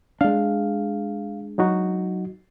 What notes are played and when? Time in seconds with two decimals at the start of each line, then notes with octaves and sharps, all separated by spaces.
0.21 G#3 D4 F5
1.58 F#3 D#4 F#4